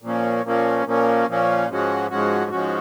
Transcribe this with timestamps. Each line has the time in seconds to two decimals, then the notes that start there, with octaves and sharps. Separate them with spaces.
0.02 A#2 F3 A#3 C#4
0.44 A#2 F3 A#3 C#4
0.85 A#2 F3 A#3 C#4
1.27 A#2 F3 A#3 C#4
1.69 G#2 F3 G#3 C#4 F#4
2.10 G#2 F3 G#3 C#4 F#4
2.51 G#2 F3 G#3 C#4 F#4